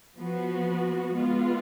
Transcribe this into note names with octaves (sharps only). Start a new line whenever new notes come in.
F3 B3 F#4
G#3 B3 F4